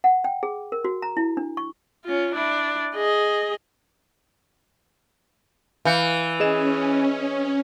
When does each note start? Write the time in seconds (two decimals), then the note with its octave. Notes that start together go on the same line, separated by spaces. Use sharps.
0.04 F#5
0.24 G5
0.43 G#4
0.72 A#4
0.84 F#4
1.02 A#5
1.17 E4
1.37 D4
1.57 C#6
2.05 C#4 F4
2.35 D4 E4
2.95 G#4 D#5
5.85 E3 F5 G6 C#7
6.40 C#4 G#4 D#5 E7